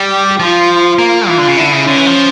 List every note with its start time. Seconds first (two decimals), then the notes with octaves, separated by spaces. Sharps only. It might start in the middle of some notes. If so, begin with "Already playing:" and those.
Already playing: G3 G4
0.40 F3 F4
0.98 A#3
1.28 E3 F4
1.38 D3
1.48 C#3
1.57 D3 E4
1.72 C#3
1.87 D3 C#4
1.97 E3
2.06 F3